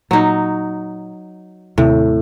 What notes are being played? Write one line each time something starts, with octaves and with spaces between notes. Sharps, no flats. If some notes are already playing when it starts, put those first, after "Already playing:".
A#2 F#3 D#4
D#2 A2 C3 C4